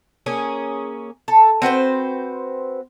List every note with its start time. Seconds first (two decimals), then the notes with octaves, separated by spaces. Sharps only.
0.26 A#3 C#4 G#4 G#5
1.28 A4
1.62 C4 F#4 B4 C5